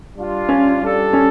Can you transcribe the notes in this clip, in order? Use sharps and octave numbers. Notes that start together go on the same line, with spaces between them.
G3 D4 F4
C#4
G3 D4 A4 D5
C#4